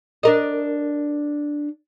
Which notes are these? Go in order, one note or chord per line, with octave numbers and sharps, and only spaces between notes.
D4 A#4 D#5